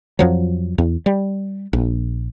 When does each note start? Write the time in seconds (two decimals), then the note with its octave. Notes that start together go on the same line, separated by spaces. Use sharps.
0.19 F2 F3 F#3
0.78 E2
1.06 G3
1.73 A#1